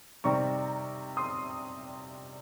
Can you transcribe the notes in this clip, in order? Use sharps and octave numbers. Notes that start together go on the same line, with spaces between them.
C3 D#3 G3 C4 A#5 C#6
C6 D#6